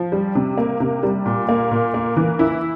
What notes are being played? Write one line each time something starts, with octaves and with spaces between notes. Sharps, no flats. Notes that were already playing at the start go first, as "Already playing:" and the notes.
Already playing: F3
G3
C3
A#3
C3
G3
A#2
A#3
A#2
A#3
E3
E4